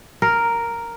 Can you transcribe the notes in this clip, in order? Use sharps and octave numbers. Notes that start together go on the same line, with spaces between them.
A#4